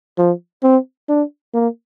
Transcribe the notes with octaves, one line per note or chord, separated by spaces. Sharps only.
F3
C4
D4
A#3